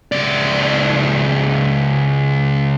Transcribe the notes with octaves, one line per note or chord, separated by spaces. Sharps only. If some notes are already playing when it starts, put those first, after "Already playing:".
C#2 D5